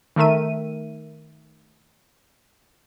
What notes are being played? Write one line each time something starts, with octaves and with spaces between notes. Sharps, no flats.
D#3 A3 A#4 E5 D#7